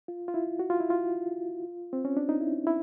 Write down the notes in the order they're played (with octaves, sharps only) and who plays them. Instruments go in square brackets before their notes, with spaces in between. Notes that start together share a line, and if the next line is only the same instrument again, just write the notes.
[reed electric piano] F4
F4
E4
F#4
F4
E4
F4
C4
C#4
D4
D#4
E4
E4